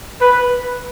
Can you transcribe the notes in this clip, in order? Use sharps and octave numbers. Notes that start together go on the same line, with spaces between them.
B4